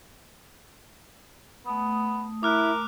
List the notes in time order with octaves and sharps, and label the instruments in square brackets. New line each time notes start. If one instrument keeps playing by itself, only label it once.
[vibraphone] A3 D#6 [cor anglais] B3
[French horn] E4 [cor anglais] A#4 [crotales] D6 F6 F#6